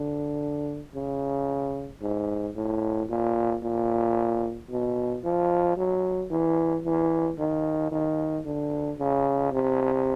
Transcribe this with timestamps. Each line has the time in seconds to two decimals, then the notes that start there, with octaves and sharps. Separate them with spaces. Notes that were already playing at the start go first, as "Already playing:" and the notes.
Already playing: D3
0.95 C#3
2.02 G#2
2.56 A2
3.09 A#2
3.63 A#2
4.70 B2
5.24 F3
5.77 F#3
6.30 E3
6.84 E3
7.38 D#3
7.91 D#3
8.45 D3
8.99 C#3
9.52 C3